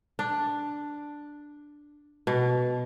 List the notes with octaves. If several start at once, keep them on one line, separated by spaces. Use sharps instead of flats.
D4
B2